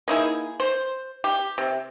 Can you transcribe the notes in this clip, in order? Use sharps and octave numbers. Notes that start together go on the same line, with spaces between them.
A#3 D#4 E4 G#4
C5
G4
C3